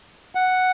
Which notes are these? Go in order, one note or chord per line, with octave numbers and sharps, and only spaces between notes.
F#5